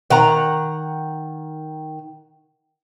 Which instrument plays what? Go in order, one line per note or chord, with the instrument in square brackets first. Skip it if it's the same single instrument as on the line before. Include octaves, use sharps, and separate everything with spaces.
[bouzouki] D#3 F#5 A#5